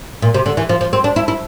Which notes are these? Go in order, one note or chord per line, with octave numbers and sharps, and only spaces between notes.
A#2
C3
D3
E3
F3
F3
C4
D4
E4
E4